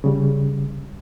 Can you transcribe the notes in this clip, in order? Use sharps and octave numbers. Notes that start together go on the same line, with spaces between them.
C#3 G3